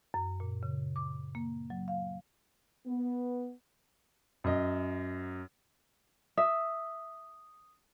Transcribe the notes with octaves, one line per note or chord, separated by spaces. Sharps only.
F#2
A#2
C#3
D6
A#3
F#3
F5
B3
F#2 D#5
E5 D#6